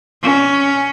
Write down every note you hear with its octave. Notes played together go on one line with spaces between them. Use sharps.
C#4